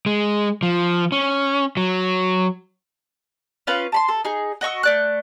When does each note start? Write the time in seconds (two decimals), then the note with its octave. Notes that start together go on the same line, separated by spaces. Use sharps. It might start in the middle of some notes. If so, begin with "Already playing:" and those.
0.06 G#3
0.63 F3
1.12 C#4
1.77 F#3
3.67 C#4 F4 B4
3.92 A5 B5 C6
4.08 A4
4.25 D#4 G#4
4.61 F#4 D#5 C#6 E6
4.83 A3 D5 F#6